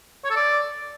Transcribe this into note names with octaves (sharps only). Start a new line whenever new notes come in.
C#5
A4
D5